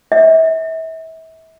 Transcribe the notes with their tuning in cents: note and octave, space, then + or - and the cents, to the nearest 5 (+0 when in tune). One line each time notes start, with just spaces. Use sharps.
E5 -35